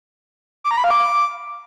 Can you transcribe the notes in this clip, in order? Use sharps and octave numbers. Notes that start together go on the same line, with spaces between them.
D6
A#5
B5
F5
D6